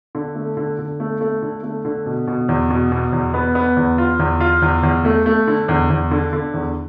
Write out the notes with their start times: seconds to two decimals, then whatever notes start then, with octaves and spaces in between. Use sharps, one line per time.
0.15 D3
0.35 A3
0.57 D3
0.79 D3
1.00 A3
1.21 A3
1.42 D3
1.63 A3
1.85 D3
2.06 B2
2.28 B2
2.49 E2
2.70 B2
2.92 B2
3.13 E2
3.34 B3
3.55 B3
3.77 E2
3.98 F4
4.19 E2
4.40 F4
4.62 E2
4.83 E2
5.05 A3
5.26 A3
5.47 D3
5.68 E2
5.90 E2
6.11 D3
6.33 D3
6.54 E2